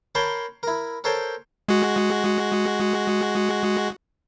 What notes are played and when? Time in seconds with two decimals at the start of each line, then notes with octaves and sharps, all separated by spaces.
0.15 A#4 C#5 G5 A5 B5 C6
0.63 E4 A#4
1.04 A4 A#4 C5 C#5 G5 A5
1.68 G#3 F#4